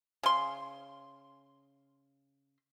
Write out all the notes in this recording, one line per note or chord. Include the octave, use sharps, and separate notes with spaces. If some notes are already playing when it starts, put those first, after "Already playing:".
C#3 C6